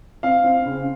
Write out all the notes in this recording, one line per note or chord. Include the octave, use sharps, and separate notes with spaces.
C4 F5
C4
C#3